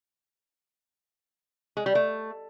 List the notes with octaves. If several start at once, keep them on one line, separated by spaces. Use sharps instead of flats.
G#3
G3
A3